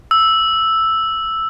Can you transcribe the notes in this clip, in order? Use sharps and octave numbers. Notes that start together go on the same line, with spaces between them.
E6